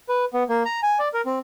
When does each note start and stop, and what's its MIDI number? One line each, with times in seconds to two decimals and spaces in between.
0.09 0.25 71
0.34 0.43 59
0.49 0.63 58
0.65 0.80 82
0.83 0.98 80
0.99 1.08 74
1.14 1.21 70
1.26 1.39 60